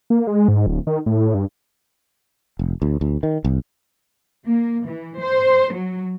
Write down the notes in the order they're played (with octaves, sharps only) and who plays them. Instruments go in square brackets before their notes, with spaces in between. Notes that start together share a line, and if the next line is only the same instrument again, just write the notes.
[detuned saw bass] A#3
G#3
G#2
D1
D#3
A2
G2
[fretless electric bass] F1
D2
D2
D#3
C2
[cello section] A#3
E3
C5
F#3